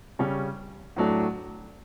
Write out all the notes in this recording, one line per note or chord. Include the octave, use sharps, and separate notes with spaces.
C#3 G3 C#4
A2 F#3 A3 D4